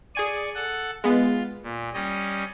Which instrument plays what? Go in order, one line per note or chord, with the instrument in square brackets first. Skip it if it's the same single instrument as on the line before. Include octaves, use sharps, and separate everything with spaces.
[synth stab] G#4 G#5 D#7 [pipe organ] D5 C#6
[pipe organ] A4 F#5
[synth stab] G#3 B3 [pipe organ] F4
[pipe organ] A#2
G3 C#4 D#5